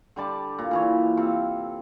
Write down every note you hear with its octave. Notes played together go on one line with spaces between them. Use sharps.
D3 G3 D5 A5
A#2
A#2 E3 C#5
C3 A4 F5